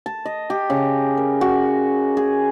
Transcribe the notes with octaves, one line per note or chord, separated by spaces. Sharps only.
A5
D#5
G4
C#3
A#4
F#4
G#4